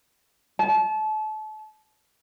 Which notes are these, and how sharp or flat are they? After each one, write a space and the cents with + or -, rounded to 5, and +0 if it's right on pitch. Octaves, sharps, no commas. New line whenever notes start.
A5 -30